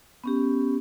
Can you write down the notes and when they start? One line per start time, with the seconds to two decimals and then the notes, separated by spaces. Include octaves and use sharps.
0.24 B3 C#4 G4